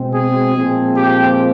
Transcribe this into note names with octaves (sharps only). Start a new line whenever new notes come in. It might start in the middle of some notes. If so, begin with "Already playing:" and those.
Already playing: B2 G#3 C4
G#4
A#2 F3 G#3 C4
G4